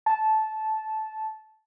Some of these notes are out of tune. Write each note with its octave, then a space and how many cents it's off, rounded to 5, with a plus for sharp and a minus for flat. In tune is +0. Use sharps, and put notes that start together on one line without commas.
A5 -15